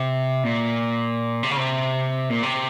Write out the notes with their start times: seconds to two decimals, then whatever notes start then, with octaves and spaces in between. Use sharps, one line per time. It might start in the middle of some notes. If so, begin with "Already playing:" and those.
Already playing: C3
0.43 A#2
1.43 C3
1.51 C#3
1.57 C3
2.29 A#2
2.43 C3